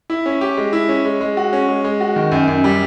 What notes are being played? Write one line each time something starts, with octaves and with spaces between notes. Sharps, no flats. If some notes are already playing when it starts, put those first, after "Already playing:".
E4
C#4
G4
G#3
E4
C#4
G#3
G#3
F#4
C#4
G#3
G#3
F#4
D#3
F#2
F#2
G3